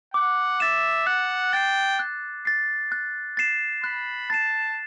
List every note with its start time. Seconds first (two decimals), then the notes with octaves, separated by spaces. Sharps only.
0.14 F#5 D6
0.60 E5 A6 E7
1.06 F#5 F#6
1.53 G5 A6 C7
1.99 F#6
2.45 A6 C7
2.92 F#6
3.37 A6 C7 E7
3.83 B5 F#6
4.30 A5 A6 C7 E7